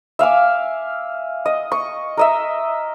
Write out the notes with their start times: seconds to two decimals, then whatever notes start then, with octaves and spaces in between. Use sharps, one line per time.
0.19 E5 F5 G#5 D6
1.46 D#5
1.72 C#6
2.17 A#4 D#5 E5